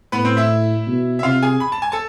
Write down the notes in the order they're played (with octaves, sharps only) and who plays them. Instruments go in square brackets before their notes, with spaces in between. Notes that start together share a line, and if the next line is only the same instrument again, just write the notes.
[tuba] A2 [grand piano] B3 B4
[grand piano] C4 C5
E4 E5
[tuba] B2
[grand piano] E5
[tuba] C3 [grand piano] F4 F5
[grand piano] G#4 G#5
B5
A5
G#5
A4 A5